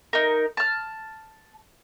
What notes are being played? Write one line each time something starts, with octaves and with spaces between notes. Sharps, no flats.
D#4 A#4
A5 F6